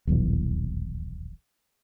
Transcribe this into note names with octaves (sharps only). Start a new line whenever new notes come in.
D#1 B1 E2 E3